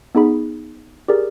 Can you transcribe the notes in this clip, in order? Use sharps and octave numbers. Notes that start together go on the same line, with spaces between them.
B3 D#4 G#4 B5
G4 G#4 A#4 D5